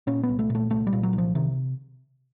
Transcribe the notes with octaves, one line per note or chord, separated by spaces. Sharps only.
A#2 C#4
B3
C2
A3
A#2
A3
C2 A3
G3
A#2
F#3
C2
F3
C3 D#3